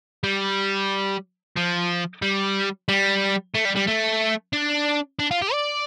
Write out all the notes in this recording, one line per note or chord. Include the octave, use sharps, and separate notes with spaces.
G3
F3
G3
G3
A3
G3
G3
A3
D4
D4
F4
G4
D5